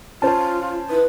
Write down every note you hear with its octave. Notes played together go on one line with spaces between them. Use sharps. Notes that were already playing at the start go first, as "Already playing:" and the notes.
C#4 F4 C5 A5
E4 B4